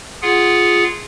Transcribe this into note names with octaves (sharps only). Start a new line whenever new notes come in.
F4 G#4 F#5